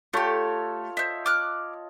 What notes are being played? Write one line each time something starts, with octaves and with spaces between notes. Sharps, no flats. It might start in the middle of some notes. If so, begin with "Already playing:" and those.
A3 F4 G4 A4 C#5
C5 D#5 E5
D6 F6 F#6